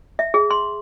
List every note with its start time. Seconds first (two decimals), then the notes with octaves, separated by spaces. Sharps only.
0.19 E5
0.34 G#4
0.51 C6